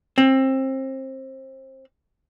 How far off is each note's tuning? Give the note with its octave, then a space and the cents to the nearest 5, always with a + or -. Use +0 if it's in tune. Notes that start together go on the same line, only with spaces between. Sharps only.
C4 +25